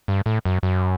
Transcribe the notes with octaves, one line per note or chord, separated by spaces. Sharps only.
G2
A2
F#2
F#2